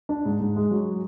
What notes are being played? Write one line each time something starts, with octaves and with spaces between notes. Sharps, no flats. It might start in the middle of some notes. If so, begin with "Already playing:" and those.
D4
G#2
G#2
G#3
F#3